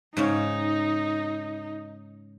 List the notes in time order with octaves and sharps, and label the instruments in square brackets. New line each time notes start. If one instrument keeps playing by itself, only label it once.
[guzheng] G#2 C#3 C#4 [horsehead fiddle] D#4